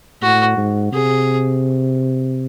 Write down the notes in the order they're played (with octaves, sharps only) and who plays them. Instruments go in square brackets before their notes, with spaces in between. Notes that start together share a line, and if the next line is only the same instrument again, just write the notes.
[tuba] A2 [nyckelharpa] F#4
[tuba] G#2
[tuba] C3 [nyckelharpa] G#4